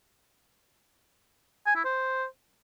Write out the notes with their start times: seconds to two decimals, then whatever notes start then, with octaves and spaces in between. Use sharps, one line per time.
1.66 G#5
1.76 E4
1.85 C5